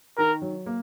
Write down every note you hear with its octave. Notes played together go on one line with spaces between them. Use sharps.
D#3 A#4
F#3
A#3